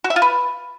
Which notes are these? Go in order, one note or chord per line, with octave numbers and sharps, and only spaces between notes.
F#4
E5
F4
B4